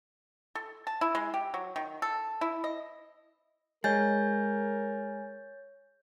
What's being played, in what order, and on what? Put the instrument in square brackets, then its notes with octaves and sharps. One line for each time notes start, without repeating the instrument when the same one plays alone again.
[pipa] A4
A5
E4
G#3
G4
F#3
D#3
A4
E4
D#5
[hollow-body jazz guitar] G#3 [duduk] A#4 [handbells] C#5 G6 A6 [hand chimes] G#5